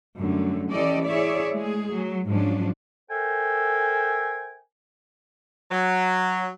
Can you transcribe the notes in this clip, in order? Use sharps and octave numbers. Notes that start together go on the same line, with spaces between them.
F#2 D3 G3 A3
E3 C#4 G4 A4 D5 D#5
E4 G#4 C#5 D5 E5
G#3 A3 G#4
F#3
G#2 F3 F#3 C#4 D4
A4 A#4 C5 E5 G5 G#5
F#3